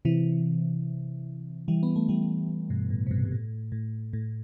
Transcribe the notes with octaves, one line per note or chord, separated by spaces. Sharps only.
C3 E3
E3 G3
B3
A3
E3 G3
G2 B2
A2
C3
G2 B2
G2
A2
A2
A2